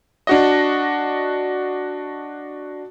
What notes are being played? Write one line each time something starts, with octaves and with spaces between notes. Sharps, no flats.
D4 F#4 D#5